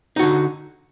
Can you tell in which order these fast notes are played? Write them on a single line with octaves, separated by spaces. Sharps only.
D#4 F#4 D3